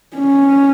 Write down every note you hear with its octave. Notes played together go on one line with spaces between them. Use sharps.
C#4